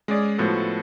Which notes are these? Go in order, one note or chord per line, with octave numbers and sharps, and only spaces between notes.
G#3 C#4 G#4 D5
A2 F3 B3 F#4 A4